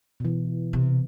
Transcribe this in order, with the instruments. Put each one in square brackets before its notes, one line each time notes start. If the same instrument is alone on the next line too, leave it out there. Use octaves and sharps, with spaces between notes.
[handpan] B2 E3
[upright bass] C3